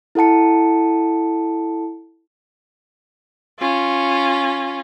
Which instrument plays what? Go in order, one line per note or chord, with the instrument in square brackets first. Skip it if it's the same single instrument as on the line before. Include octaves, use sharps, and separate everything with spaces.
[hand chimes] E4 A4 F#5 A5 C#7
[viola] C#4 F4